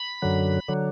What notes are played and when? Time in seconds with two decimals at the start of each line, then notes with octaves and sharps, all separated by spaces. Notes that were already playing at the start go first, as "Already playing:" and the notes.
Already playing: B5
0.22 F#2 D3 F#3
0.68 D3 F#3